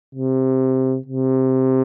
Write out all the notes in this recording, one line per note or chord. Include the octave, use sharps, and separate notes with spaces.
C3
C3